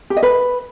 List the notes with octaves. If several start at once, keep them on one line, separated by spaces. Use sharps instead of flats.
G4
D#5
B4